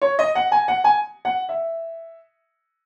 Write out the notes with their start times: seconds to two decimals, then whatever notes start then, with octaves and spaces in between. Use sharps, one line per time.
0.02 C#5
0.19 D#5
0.35 F#5
0.52 G#5
0.68 F#5
0.84 G#5
1.25 F#5
1.49 E5